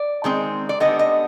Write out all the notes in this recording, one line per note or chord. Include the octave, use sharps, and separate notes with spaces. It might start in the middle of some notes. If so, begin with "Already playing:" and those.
Already playing: D5
D#3 G#3 C4
D5
D3 G3 B3 D#5
D#5